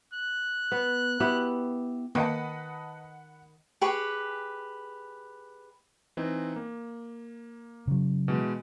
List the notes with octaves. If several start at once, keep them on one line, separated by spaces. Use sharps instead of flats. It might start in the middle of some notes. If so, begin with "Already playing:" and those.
F#6
B3
B3 E4 G4
D#3 A#3 B4 D#5 F#5 A5 B5 C#7
G4 G#4 B4 C#6
E3 C4 D#4
A#3
C#3 F#3
B2 E3 G#3